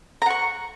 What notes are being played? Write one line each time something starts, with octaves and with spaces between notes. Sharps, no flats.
F#5 A#5 C#6